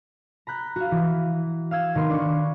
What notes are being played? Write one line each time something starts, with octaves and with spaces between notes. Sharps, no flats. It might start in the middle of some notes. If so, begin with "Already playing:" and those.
A#5 B5 F#6 G6
F#4 F5
E3
F5 E6 G#6
D#3 B3 C6
D4 C#6